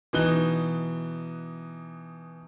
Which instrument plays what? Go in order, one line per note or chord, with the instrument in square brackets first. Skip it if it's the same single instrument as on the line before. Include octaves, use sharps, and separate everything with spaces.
[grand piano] B2 E3 D#4 F#6 G7